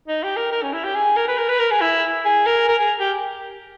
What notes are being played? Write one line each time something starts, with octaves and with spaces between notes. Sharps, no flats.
D#4
G4
A#4
A#4
C#4
E4
G4
G#4
A#4
B4
A#4
B4
A#4
G#4
E4
G#4
A#4
A#4
G#4
G4